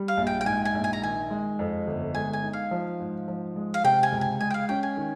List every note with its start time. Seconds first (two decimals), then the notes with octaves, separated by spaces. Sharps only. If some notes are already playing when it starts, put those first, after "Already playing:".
Already playing: G3
0.08 F5
0.17 A#1
0.27 G5
0.41 G5
0.46 G#2 G#5
0.65 G#5
0.75 A#1
0.84 G#5
0.93 A#5
1.03 D#3 G#5
1.30 G#3
1.59 F2
1.87 G1
2.15 G#3 G#5
2.33 G#5
2.43 D#4
2.53 F5
2.71 F3
3.00 G#2
3.28 F3
3.56 G#3
3.74 F5
3.84 C3 G5
4.03 G#5
4.12 C#2
4.21 G#5
4.40 G#3 G#5
4.50 G5
4.54 F5
4.69 C#4 G5
4.83 G#5
4.97 D#3